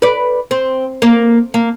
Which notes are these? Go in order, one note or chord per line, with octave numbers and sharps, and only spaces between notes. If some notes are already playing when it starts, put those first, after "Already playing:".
B4 D5
C4
A#3
A#3